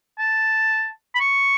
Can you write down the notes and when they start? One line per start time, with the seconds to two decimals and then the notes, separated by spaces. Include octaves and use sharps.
0.19 A5
1.15 B5
1.20 C#6